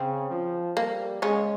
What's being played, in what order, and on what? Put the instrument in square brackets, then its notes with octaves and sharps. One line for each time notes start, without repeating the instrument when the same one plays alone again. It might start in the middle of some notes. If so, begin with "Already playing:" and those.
Already playing: [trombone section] C#3 [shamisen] C4
[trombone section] F3
[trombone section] G3 [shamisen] A#3
[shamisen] C#3 C#4 [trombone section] G#3